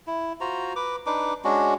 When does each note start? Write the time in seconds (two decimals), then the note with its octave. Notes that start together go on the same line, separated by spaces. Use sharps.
0.07 E4
0.41 F4 F#4 C5 A#5
0.76 B4 D6
1.06 D4 D#4 B4 D6
1.44 G#3 C#4 D4 F#4